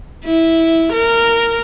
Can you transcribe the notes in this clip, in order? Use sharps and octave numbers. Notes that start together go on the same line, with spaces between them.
E4
A#4